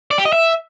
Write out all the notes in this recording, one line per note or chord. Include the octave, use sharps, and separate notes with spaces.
D5
G4
D#5
E5